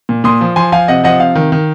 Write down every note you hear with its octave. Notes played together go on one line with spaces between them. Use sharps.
A#2
A#2 C6 D#6
F3
F3 G#5 C6
F3 F5 G#5
C3 D#5 F#5
F3 D#5 F#5
C3 F5
D#3
D#3